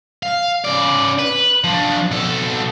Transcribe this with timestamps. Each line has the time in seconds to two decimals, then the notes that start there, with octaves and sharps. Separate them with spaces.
0.23 F5
0.64 C#3 D5
1.19 B4
1.64 F3 D4
2.11 B2 A4